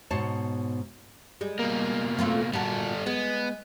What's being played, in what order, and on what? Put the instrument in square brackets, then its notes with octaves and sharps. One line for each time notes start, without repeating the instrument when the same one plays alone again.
[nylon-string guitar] G#2 B2 C#5 A5
[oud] G3 G#3
[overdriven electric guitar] B2 A#3
[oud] A3 C4 F4
[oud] A#2 F#4 [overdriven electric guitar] G3 A4
[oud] G#3 [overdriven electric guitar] B3